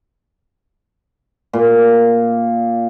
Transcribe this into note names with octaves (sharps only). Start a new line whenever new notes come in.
A#2